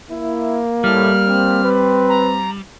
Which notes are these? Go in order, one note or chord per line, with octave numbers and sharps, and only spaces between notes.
A#3 E4
A2 G3 F6
C4
B4
A#5